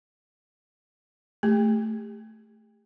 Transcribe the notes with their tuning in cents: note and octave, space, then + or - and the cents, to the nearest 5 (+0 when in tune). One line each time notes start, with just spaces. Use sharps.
A3 +0 G4 +40